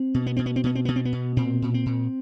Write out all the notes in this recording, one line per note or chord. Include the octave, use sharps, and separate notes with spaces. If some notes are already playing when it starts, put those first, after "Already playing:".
Already playing: C4
B2
B3
B2 C4
B3
C4
B2 B3
C4
B2 B3
C4
B3
B2
A#2 C4
A#2
C4
A#2